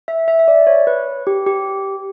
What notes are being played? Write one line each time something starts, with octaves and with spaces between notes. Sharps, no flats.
E5
E5
E5
D5
C#5
B4
G4
G4